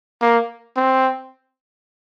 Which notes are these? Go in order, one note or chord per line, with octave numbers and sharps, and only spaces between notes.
A#3
C4